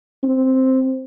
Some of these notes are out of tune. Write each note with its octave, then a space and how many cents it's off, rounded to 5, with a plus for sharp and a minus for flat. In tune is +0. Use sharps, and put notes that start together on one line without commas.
C4 +0